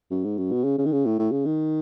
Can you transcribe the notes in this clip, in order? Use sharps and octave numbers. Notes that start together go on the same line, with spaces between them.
F#2
G#2
F#2
B2
C#3
C#3
D#3
C#3
A2
A2
C#3
D#3